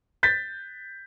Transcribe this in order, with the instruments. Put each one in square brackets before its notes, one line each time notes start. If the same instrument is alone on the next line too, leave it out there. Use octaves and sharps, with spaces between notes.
[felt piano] G6 A6 B6